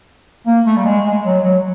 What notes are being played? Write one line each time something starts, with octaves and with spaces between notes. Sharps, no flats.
A#3
A3
G3
G#3
G#3
F#3
F#3